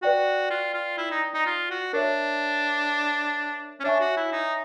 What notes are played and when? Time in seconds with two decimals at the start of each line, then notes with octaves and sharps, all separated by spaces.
0.02 F#4 B4 D5 G5
0.50 F4
0.74 F4
0.98 E4
1.11 D#4
1.34 D#4
1.46 F4
1.70 F#4
1.93 D4 A#4 C#5 E5
3.80 C#4
3.84 D4 C#5 E5 G#5 C#6
4.00 F#4
4.17 E4
4.32 D#4